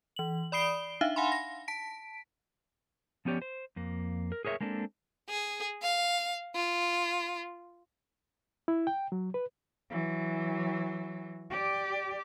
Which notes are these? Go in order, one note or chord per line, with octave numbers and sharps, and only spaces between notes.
E3 F#7
D5 B5 D#6 C7 D7 G7
D4 D#4 E5 F5
F5 F#5 G#5 B5 C6
A#6
A5 B6 D7
F3 B3 C#4 G4 C#5 D5
C5
F2 A#3
A#4
G#4 A#4 C#5 D#5 E5
G#3 A#3 C4 D4 A4
G#4
F5
F4
E4
G5
F#3
B4
E3 F#3
G4 D5